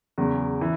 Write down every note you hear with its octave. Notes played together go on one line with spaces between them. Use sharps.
E2 C#3 F#3
E3